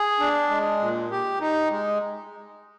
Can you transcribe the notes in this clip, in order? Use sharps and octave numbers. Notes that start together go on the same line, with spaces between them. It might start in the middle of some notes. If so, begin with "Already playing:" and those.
Already playing: G#4
D4
G#3
A#2
G4
D#4
G#3